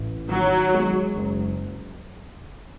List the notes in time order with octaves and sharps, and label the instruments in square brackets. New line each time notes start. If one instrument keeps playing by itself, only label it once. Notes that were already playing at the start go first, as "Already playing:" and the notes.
Already playing: [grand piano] A1
[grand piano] D#3 [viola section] F#3
[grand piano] G#3
F#1